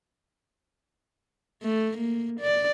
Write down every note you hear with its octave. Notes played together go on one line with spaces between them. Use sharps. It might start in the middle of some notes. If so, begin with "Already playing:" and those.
A3
A#3
D5